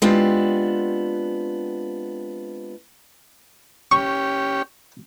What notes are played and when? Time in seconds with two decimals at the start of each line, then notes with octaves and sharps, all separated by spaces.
0.02 G#3 B3 C4 D4 F4 G4
3.92 C#4 G4 C#6